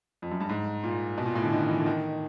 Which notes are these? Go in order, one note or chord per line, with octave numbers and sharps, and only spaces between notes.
F2
F#2
G2
G#2
A#2
B2
A#2
A2
D3
D#3
E3
D3
D#3